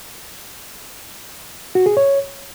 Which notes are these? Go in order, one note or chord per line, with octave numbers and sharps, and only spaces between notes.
F#4
G#4
C#5